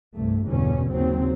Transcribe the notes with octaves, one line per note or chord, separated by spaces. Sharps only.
C2 G2 A3
G1 E2 B2 D3 C#4
D#2 C#3 F#3 C4